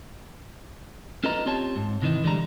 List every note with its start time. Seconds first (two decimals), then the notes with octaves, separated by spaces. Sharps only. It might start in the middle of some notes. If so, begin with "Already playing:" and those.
1.24 C#4 F4 A4 B4 D#5 A#5
1.46 C4 F4 G4 C#5 A5
1.76 G#2
2.02 C3 D#3 E3 D#4
2.24 D3 E3 G3 G#3 A#5